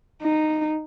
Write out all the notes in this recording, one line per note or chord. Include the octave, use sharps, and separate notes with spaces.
D#4